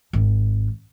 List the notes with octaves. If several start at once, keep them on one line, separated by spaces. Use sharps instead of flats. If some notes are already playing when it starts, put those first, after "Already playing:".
G#1